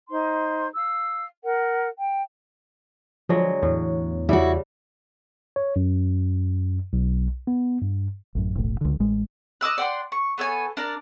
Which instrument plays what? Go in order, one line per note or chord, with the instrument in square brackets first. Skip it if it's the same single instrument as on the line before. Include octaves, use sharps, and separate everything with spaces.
[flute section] D#4 C5 C6
F5 E6
A#4 F#5
G5
[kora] D3 F#3 G#3 [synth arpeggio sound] F3
[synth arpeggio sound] E2 [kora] A2
[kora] C#3 G3 [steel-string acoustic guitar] E4 F#4
[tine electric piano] C#5
F#2
B1
B3
G2
[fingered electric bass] A1 F#2
E1 B1 A2
C#2 D3
A1 G#3
[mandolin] D#5 D6 E6 F#6
D5 F#5 G5 C6
C#6
B3 A4 C#5 G#5
D4 A#4 D5